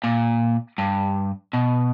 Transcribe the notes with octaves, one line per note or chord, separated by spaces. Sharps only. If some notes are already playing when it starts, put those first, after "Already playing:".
A#2
G2
B2